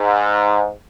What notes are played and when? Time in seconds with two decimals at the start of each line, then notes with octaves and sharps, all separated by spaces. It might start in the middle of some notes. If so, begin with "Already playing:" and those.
Already playing: G#2